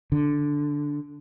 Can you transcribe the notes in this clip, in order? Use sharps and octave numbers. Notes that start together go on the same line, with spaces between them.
D3